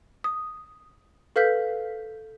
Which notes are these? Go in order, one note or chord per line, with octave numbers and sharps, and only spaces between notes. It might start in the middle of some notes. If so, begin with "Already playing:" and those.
D#6
A4 B4 F5 F6 G6 B6